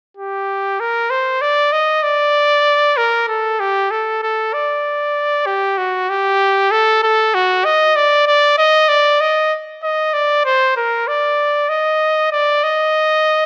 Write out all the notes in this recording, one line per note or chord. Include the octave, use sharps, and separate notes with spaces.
G4
A#4
C5
D5
D#5
D5
A#4
A4
G4
A4
A4
D5
G4
F#4
G4
A4
A4
F#4
D#5
D5
D5
D#5
D5
D#5
D#5
D5
C5
A#4
D5
D#5
D5
D#5